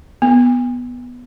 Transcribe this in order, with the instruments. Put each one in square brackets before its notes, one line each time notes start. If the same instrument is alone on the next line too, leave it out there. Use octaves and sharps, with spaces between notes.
[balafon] B3